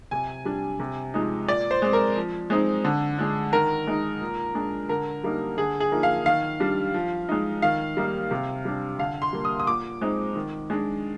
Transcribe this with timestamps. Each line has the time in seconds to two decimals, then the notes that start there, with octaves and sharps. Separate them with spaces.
0.11 C3 G#5
0.45 G3 D4
0.80 C3
1.14 F3 G#3 D#4
1.48 A#2 D5
1.71 C5
1.82 G#3 C4
1.93 A#4
2.16 F3
2.50 G#3 C4 D#4
2.85 D3
3.18 G#3 D4
3.53 D#3 A#4
3.87 G#3 D#4
4.21 A#2
4.55 G#3 D4
4.89 D3 A#4
5.24 G3 A#3 D#4
5.58 D3 G#4
5.80 G#4
5.92 F3 A#3 D#4
6.03 F5
6.26 D#3 F5
6.60 G3 D4
6.94 F3
7.29 G#3 D#4
7.62 D#3 F5
7.97 G3 A#3 D#4
8.31 C3
8.65 G3 D4
8.99 D3 F5
9.22 C6
9.33 G3 A#3
9.45 D#6
9.60 D#6
9.67 A#2 D6
10.01 G#3 C4 D#4
10.36 D#3
10.70 G#3 D4